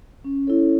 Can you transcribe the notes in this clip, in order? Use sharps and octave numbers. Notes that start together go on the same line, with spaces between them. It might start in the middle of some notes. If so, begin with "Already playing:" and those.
C#4
E4 A4 C#5